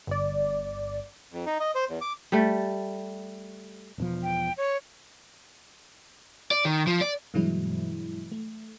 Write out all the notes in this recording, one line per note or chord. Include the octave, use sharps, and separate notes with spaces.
G1 D5
F2
D#4
D#5
C5
E2
D6
G3 A3
E1 B2 F3
G5
C#5
D5
D#3
F3
D5
G2 B2 E3 F#3 G#3 E4
A3